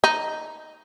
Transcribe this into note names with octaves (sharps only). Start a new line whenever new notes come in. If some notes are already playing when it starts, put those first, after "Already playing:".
D#4